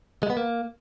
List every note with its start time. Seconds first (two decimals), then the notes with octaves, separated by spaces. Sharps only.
0.23 G#3
0.30 B3
0.37 A#3